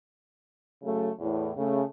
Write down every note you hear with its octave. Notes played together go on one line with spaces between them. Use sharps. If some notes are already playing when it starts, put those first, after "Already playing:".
C#3 F#3 A3
E2 A2
C#3 A3